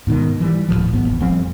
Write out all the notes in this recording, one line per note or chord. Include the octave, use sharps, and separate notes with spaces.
G#2 B2 D#3
E3 G3
D#1 F#2 A2 F3
A1 G#2 B3
F#1 E2
F2 F3 G3 C4